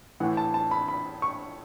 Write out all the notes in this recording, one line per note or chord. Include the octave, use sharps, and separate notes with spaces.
A2 E3 F#5
A5
A5
B5
B5
C#6